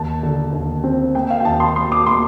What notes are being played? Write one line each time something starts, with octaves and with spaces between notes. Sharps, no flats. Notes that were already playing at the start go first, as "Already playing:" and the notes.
Already playing: D#2 A5
D3
D#2
C4
A#3 G5
F5
G5
D#2 A5
C6
A#3 C6
D6
A#3 C6